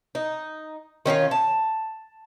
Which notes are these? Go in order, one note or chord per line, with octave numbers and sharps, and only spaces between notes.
D#4
D#3 C#4 E4 F4
A5